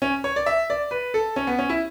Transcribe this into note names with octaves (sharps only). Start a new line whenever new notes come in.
C#4
C#5
D5
E5
D5
B4
A4
C#4
B3
C#4
E4